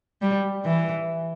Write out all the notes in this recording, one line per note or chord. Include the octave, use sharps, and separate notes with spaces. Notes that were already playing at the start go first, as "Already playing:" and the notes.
G3
E3